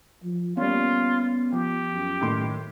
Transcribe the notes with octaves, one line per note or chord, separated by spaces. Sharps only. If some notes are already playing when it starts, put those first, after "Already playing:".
F3
G3 A#3 B3 C#4 F4
F3 G4
F#2
A2 D#3 C6